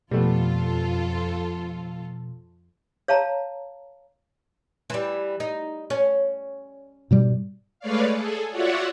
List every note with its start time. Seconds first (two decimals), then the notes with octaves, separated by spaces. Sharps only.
0.11 F2 B2 F3 G3 A3 B3 F4 A4
3.08 C#5 F5 A5 A#5
4.90 E3 G3
5.40 D#4
5.90 C#4
7.11 G#2 B2 G3
7.80 G#3 A3 B4 C#5 D5 F5
8.13 G#4 A4
8.51 F4 F#4 C#5 D5 E5 F#5